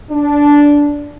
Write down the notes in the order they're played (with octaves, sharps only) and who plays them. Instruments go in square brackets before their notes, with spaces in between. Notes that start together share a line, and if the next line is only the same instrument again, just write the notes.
[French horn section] D4